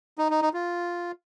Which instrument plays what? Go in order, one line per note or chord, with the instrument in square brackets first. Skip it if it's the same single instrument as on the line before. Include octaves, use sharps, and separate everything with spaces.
[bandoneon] D#4
D#4
D#4
F4